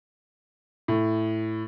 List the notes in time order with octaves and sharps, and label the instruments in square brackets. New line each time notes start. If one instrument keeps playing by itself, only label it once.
[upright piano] A2